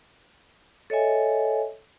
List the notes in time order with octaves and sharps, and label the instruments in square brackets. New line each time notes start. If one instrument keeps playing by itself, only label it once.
[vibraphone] A4 C#5 D#5 E5 G#5